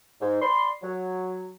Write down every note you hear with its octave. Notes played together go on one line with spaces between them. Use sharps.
G#2
D5 B5 C6
F#3